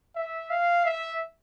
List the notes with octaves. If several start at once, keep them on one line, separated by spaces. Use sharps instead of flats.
E5
F5
E5